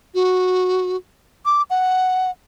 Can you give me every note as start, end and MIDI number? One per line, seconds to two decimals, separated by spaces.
0.14 0.96 66
1.45 1.63 86
1.70 2.31 78